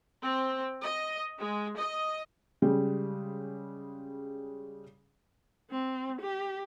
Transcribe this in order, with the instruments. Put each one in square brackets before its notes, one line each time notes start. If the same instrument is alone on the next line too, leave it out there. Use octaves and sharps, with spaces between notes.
[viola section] C4
D#5
G#3
D#5
[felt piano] C#3 G3 G#3
[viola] C4
G4